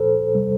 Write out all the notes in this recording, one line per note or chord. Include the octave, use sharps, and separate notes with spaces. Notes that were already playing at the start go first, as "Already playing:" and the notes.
Already playing: A#2 F3 A4 C5
C3 G3